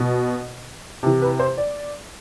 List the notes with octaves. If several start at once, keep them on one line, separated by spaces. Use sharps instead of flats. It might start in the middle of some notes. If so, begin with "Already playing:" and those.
Already playing: B2
C3 E3
B4
C5
D5